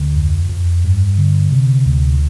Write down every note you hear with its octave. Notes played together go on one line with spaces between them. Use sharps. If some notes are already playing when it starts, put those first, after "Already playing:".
Already playing: D2
F2
F2
G2
D3
C3
D2